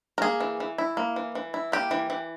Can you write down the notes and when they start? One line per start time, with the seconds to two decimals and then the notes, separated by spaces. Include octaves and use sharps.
0.18 A#4
0.22 A#3 G#4
0.40 E3
0.60 E3
0.78 E4
0.97 A#3
1.16 E3
1.35 E3
1.54 E4
1.72 A#3 G4
1.91 E3
2.10 E3